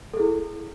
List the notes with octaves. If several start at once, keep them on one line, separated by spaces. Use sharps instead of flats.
E4 G#4 A4